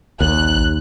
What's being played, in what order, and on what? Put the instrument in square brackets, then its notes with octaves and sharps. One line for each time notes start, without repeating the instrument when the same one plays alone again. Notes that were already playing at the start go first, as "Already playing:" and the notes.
[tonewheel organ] A#1 [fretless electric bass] D#2 [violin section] F#6